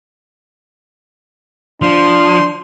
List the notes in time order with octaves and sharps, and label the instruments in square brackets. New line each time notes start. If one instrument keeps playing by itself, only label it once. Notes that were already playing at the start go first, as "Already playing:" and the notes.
[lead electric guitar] F3 [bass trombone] D4 [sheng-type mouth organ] C6